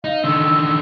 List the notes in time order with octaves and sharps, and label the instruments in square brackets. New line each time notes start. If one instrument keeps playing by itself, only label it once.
[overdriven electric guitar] D#4 [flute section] F5
[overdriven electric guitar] D3 D#3 [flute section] A4 E6